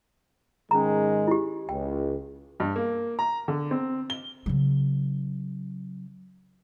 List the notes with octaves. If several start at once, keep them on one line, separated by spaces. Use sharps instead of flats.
G#2 D#3 G#3 C#4 A#5
E4 G4
C#2 G5
G2
A#3
A#5
D3
C4
G7
C#3 F#3